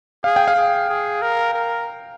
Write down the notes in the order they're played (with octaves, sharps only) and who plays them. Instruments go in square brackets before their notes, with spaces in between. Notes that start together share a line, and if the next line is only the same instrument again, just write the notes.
[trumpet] G#4 [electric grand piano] F5
[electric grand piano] G5
F5
[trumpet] G#4
G#4
A#4
A#4